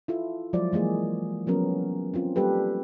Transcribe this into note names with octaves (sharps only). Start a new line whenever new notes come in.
E4 F4 A4
F3 F#3 G#3 F4 C5 D5
E3 G#3 A#3 G#4
F3 F#3 B3 C#4 A#4
C4 C#4 F4
G3 A#3 G4 A4 B4